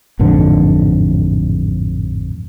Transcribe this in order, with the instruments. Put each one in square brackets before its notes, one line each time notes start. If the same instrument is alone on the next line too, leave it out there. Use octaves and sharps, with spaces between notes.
[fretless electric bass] A1 F2 G#2 D3